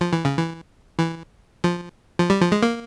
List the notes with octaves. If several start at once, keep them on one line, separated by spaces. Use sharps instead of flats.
F3
E3
C#3
E3
E3
F3
F3
G3
F3
G#3
A#3